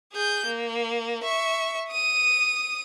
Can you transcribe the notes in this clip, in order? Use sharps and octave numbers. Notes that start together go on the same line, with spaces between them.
G#4 G6
A#3
E5 C#6
D#6 D#7